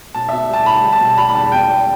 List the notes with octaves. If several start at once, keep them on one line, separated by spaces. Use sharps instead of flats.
B1 A5
E5
B2
G3 A5
B1 B5
G3
A5
B1
G3 B5
B5
E2 A5
B2 G5
E2